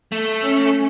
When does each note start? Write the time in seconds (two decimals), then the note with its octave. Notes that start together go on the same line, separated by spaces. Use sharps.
0.12 A3
0.42 C#4